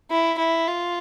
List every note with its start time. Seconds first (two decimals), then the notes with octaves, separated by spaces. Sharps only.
0.10 E4
0.38 E4
0.67 F4